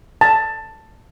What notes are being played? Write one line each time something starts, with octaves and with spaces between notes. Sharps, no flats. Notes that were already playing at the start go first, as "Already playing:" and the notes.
A5